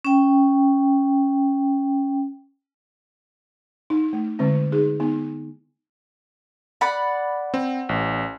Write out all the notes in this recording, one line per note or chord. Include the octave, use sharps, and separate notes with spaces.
C#4 G5
D#4
A3
D3 G#3 C4
D#4 G#4
B3 D#4
D5 F#5 B5
C4
A1